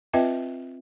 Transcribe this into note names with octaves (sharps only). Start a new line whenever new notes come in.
C4 F4 B4 D#5 E5 G5